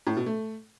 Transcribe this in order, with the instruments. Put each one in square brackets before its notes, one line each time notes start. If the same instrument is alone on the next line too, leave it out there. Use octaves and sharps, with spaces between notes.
[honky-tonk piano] A2
B2
A3